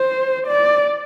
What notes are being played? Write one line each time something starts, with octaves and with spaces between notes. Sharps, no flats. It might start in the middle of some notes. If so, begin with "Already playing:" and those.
Already playing: C5
D5